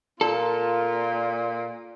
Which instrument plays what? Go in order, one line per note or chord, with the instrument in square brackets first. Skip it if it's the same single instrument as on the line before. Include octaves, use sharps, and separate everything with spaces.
[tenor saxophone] A#2 [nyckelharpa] F4 [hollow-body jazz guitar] A4 [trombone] A#4